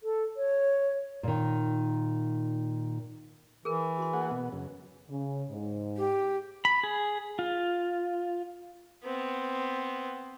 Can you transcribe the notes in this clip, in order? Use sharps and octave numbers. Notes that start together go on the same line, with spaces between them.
A4
C#5
A#2 D#3
E3 G#4 A#4
F#4 C6
A#3 G#4 F#5
B2 B3
F#2 C#3
C#3
G#2
G4
B5
G#4
F4
B3 C4